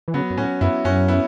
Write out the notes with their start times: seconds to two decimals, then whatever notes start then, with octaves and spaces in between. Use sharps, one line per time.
0.08 E3
0.14 C#3 F#3 B3
0.31 F#2
0.37 A2 C#4 F#4
0.61 F#2 B3 E4
0.85 F#2 C#4 F#4
1.08 B3 E4